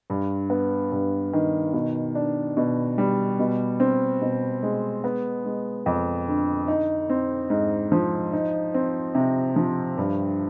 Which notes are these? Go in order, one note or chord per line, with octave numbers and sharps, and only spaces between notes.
G2
B3
G2
D#3
B2
D4
B2
G3
B2
C4
B2
G#3
B3
G#3
F2
D3
D#4
C4
G#2
F3
D#4
C4
C3
F3
G2